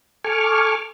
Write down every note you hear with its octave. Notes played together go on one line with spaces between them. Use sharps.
A4 G#5 C#6 D6 F6